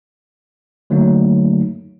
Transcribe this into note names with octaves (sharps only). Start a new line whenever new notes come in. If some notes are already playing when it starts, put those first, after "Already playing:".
D3 F#3 A3 A#3 D#4